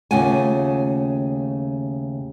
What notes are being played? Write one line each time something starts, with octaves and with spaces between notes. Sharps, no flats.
D#2 C#3 A3 F4 F#5 G#5